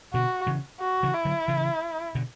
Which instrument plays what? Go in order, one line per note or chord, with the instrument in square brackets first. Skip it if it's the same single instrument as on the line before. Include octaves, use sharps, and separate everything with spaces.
[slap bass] B2 D3 [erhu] F#4
[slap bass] C#3 E3
[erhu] F#4
[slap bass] C#3 E3
[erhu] E4
[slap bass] D3 F#3
C#3 E3
B2 D3